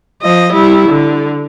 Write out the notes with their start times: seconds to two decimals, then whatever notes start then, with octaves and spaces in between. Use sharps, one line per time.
0.22 F3 D#5
0.53 G3 E4
0.89 D3